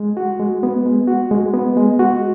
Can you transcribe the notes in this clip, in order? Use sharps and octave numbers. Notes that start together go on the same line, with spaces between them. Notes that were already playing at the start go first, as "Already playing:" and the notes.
Already playing: G#3
F#4
G#3
B3
G#3
F#4
G#3
B3
G#3
F#4